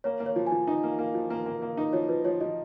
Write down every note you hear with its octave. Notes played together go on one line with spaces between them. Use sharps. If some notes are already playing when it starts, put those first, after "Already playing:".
A#3 C#5
A#3
C#5
F3
F3 G#5
D#4
A#3
A#3
F3
A#3
A#3
A#3
D#4
F3 C#5
F3 B4
F3 C#5
F3 D#5